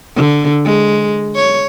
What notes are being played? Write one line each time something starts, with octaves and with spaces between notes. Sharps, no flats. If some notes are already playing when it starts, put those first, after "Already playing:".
D3
G#3
C#5